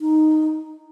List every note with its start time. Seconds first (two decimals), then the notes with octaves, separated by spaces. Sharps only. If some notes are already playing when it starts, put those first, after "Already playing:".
0.01 D#4